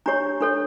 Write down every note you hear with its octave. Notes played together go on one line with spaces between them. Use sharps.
D4 G4 C#5 A#5
D4 A4 C#5